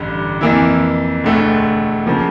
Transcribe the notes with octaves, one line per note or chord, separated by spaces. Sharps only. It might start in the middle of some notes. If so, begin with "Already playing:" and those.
Already playing: A1 G2 D3
F2 E3 A#3 E4
E1 D2 D3 A3
C#3 F3 A#3